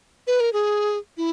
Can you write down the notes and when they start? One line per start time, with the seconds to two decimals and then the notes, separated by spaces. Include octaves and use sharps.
0.27 B4
0.40 A#4
0.53 G#4
1.17 E4